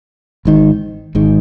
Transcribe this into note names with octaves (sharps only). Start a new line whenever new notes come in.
G#1 G#2 D#3
G#1 G#2 D#3